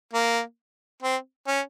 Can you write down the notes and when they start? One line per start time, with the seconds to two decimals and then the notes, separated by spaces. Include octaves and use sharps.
0.14 A#3
1.03 C4
1.47 C#4